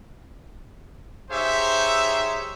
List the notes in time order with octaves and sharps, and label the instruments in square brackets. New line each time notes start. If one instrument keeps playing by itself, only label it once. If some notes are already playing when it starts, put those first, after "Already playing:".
[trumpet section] D#4 G4 G#4 C5 C#5 E5